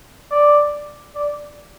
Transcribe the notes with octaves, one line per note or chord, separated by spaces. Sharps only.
D5
D5